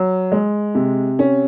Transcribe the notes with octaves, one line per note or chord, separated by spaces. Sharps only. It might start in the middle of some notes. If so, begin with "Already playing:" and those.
Already playing: F#3
G#3
C3
C#4